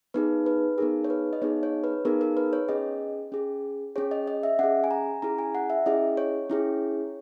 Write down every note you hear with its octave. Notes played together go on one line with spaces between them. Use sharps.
B3 D#4 G#4 B4
B4
B3 D#4 G#4 A#4
C#5
B4
D#5
B3 D#4 G#4 C#5
C#5
B4
B3 D#4 G#4 A#4
A#4
B4
C#5
C#4 G#4 D#5
C#4 G#4
C#4 G#4 C#5
D#5
D#5
E5
C#4 G#4 F#5
G#5
A#5
C#4 E4 G#4 A#5
G#5
F#5
E5
C#4 E4 G#4 D#5
C#5
C#4 E4 G#4